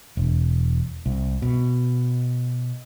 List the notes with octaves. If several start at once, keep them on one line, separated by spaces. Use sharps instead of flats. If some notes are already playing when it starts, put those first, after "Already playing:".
E1
C2
B2